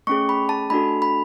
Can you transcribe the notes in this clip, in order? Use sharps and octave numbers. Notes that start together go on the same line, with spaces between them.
A3 C#4 G#4 C#6
B5
A5
A3 D4 F#4 A4 B5
B5